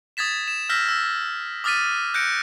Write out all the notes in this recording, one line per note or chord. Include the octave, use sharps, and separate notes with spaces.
D#6 G#6 A6 B6 E7
E7
E6 F6 G6 A#6 B6
E6
D6 D#6 F6 A6 B6 D#7
F#6 G6 A#6 C#7 D7